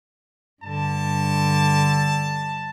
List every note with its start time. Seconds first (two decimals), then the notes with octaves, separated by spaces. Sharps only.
0.63 G2 D3 A5